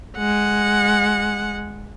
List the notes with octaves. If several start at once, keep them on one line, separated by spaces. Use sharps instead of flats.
G#3 F#5